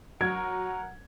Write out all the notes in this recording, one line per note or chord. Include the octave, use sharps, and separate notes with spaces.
F#3 A#4 C#5 F#5 G#6